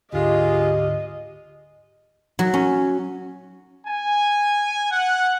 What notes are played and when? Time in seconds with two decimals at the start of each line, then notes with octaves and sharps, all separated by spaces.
0.13 D2 G#2 D3 G#3 F4 G4 D#5
2.39 F#3
2.54 C#4
3.87 G#5
4.91 F#5